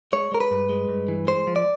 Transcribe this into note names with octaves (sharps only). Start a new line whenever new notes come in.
G#3 C#5
G#3 A#4
B4
G2
G#3
G2
E3
G#3 C5
F3
D5